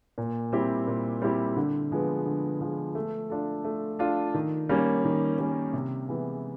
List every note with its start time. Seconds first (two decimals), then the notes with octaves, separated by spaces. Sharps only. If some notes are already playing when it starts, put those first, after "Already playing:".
0.18 A#2
0.53 G3 C4 E4 G4
0.87 A#2
1.22 G3 C4 E4 G4
1.56 D3
1.92 F3 G#3 B3
2.26 D3
2.60 F3 G#3 B3
2.95 A3
3.30 D4 F4 A4
3.65 A3
3.99 D4 F4 A4
4.34 D#3
4.69 G3 A#3 C#4
5.05 D#3
5.38 G3 A#3 C#4
5.73 C3
6.08 E3 G#3 B3 E4